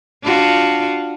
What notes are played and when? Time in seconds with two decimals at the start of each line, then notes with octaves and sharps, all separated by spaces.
0.23 D4 F4 F#4